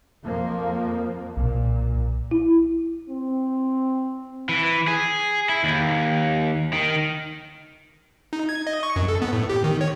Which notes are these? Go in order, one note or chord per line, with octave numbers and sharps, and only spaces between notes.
F2 F3 A#3
B1 A#2
E4
C4
E3
G#4
E4
D#2
D#3
D#4
G#6
D#5
C#6
F#2
A4
B3
A2
G4
D#3
C#5